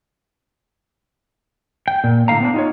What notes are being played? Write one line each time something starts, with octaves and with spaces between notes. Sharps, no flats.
G5
A#2
A2 D3 F5 A#5
B3 C4 D4
D#4 F4 C#5